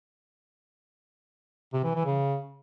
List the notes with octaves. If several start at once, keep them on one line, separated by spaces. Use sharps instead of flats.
C3
E3
E3
C#3